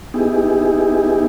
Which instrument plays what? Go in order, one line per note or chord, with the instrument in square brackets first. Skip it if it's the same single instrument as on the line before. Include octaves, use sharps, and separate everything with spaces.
[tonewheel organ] B3 D#4 E4 G4 G#4